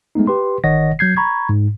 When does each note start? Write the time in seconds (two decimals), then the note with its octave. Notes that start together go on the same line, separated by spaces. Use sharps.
0.15 G#3 A3 B3 D#4
0.27 G4 B4 C6
0.64 G1 D#3 C#5 D#5 F#5 A#6
0.99 F#3 G6 G#6 C7
1.17 A#5 B5 C#6 G#6
1.49 G#2